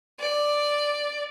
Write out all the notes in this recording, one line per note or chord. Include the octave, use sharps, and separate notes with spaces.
D5